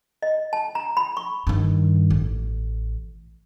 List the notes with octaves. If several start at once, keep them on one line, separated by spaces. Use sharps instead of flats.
D#5
A5
A#5
B5
C#6
G2 D#3
A1